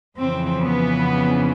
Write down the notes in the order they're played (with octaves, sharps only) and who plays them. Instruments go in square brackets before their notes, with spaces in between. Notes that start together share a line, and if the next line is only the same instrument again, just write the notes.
[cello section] F2 C#3 E3 C4
B3